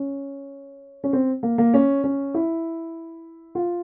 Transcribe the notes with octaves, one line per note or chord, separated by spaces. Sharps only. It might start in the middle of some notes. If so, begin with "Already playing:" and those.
Already playing: C#4
C#4
C4
A#3
A#3
C#4
C#4
E4
F4